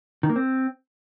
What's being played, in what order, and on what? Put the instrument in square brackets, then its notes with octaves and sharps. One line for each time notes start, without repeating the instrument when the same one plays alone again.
[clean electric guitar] D#3
A#3
C4